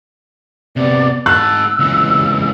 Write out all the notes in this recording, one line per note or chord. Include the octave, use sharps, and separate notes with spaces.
C3 B3 D5
G#2 A5 E6 F#6
C#2 E3